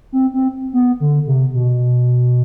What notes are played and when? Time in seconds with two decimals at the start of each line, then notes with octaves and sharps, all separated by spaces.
0.12 C4
0.34 C4
0.73 B3
1.00 D3
1.27 C3
1.54 B2